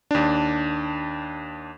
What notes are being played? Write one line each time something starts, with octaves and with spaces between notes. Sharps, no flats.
D#2 D4